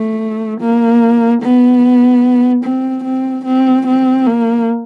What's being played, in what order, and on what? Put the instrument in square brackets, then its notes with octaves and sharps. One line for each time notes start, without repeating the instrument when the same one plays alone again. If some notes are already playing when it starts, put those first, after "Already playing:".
Already playing: [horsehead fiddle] A3
A#3
B3
C4
C4
C4
C4
A#3